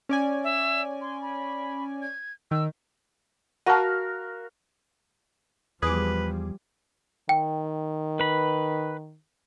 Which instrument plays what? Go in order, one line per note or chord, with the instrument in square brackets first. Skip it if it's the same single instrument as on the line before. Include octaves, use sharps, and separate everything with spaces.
[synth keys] C#4 D5 G#5
[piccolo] E5
C6
B5
G#6
[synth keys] D#3 [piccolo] E6
[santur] F#4 A#4 F5 [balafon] F#5 A5
[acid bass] E2 [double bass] F3 G3 [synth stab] G#4 D6 [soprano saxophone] B4
[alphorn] D#3 [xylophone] G5
[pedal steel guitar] B4 B5